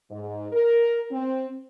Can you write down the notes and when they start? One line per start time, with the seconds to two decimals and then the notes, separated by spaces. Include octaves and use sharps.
0.11 G#2
0.52 A#4
1.11 C4